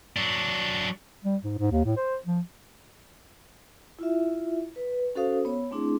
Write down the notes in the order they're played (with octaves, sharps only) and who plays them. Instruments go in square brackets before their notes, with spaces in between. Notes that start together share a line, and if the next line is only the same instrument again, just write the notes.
[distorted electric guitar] F#3 D4
[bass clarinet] G3
G#2
G#2
D#2
A2
C5
F3
[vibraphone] E4 F4 E5
B4
C#4 F#4 A4 C5 F5 D#6
B3 C#5
A3 C4 D4 E4 G#4